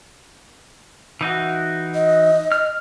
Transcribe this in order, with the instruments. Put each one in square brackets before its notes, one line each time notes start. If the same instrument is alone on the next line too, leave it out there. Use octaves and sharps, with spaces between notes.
[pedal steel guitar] E3 D#4 F#4
[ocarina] D#5
[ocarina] D#5 [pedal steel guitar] F6